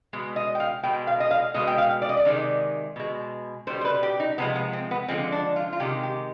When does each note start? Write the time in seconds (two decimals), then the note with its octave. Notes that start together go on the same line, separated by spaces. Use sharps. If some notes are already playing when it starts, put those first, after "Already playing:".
0.13 B2 G#3
0.36 D#5
0.55 G5
0.60 F5
0.83 B2 G#3 G5
1.07 F5
1.20 D#5
1.31 F5
1.54 B2 G#3 D#5
1.67 G5
1.78 F5
2.02 D5
2.09 D#5
2.17 D5
2.25 C3 D#3 G#3
2.96 B2 G#3
3.67 B2 C5
3.70 G3
3.81 C5
3.85 B4
4.03 G4
4.20 D#4
4.38 C3 F3 G#3 B3
4.56 B3
4.73 C4
4.91 B3
5.08 D3 F3 G#3 C4
5.32 D4
5.56 F4
5.73 F4
5.80 C3 D#3 G#3 G4
6.03 G4